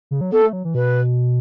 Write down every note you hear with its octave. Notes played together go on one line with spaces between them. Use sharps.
C#3
F#3
B3 A4
A3
F#3
E3
B2 B4